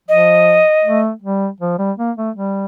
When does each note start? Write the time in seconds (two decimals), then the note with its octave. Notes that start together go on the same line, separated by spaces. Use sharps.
0.08 F3 D#5
0.84 A3
1.22 G3
1.61 F3
1.79 G3
1.98 A#3
2.17 A3
2.36 G3